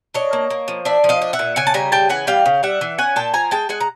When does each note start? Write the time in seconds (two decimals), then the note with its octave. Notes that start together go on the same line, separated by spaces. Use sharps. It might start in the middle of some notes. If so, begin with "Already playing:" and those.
0.14 D4 C#5 D#5
0.33 A#3
0.50 A#3
0.68 F3
0.85 D4 D5 E5
1.04 F3
1.09 D#5 F5
1.22 D4
1.33 E5 F#5
1.39 A#2
1.56 C#3 F#5 G#5
1.67 A5
1.74 G3 G#5 A#5
1.92 C#3 G5 A5
2.09 E3 F#5 G#5
2.27 G3 F5 G5
2.46 C#3
2.63 G3 E5 F#5
2.81 E3
2.98 C#4 F#5 G#5
3.16 A#2 G5 A5
3.34 F3 G#5 A#5
3.51 G#3 G5 A5
3.69 G#3 F#5 G#5
3.81 A#5